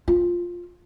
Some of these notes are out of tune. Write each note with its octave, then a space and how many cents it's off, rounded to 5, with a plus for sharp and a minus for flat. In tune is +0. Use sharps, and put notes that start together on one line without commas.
F4 +5